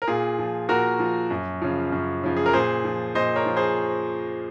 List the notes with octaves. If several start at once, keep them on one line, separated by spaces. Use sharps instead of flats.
A#4
A#2 F4 G#4
F3
A#2 F#4 A#4
F3
F#2
C#3 F3
F#2
C#3 F3
G#4
A#4
A#2 G#4 C5
F3
A#2 C5 D#5
A#4 C#5
F3
G#4 C5